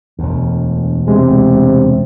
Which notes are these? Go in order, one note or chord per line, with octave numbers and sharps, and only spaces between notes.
E1 D2
C3 G#3